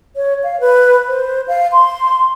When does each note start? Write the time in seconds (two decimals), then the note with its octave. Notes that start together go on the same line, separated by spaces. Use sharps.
0.16 C#5
0.43 F5
0.60 B4
1.08 C5
1.48 F5
1.72 C6